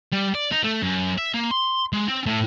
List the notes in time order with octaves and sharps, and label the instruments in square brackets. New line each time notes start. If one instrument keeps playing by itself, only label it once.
[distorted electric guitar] G3
D5
D#4
A3
F#2
E5
A#3
C6
G#3
C4
A2